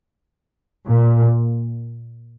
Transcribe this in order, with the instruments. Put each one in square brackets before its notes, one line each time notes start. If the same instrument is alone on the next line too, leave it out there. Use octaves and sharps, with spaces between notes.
[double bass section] A#2